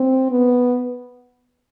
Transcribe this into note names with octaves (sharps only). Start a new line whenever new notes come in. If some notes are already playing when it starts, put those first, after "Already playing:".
Already playing: C4
B3